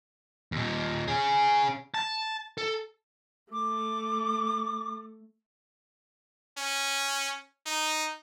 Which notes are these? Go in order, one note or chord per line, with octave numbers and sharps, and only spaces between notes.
D#2 A#2
C#4 G#4
A5
A4
A3 D6
C#4
D#4